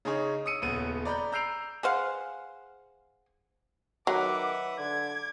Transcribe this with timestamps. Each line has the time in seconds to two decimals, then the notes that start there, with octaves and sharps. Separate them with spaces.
0.05 C#3 D#4 G#4 C#5
0.46 D#6 E6 C#7 D#7
0.62 D#1 C#3 B3 D#7
1.05 D5 A#5 B5 G6
1.32 A#5 E6 G6 C7 D7 F7
1.83 G#4 C5 F5 F#5
4.07 D#3 F#3 B4 E5 F#5 D6
4.78 D3 D6 G#6